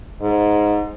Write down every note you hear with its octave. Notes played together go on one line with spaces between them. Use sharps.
G#2